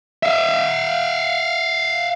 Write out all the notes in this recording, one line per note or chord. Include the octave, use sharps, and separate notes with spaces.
E5 F5